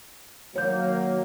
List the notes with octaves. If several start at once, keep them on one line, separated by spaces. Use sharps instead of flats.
D#3 F#3 A#3 C#5 G6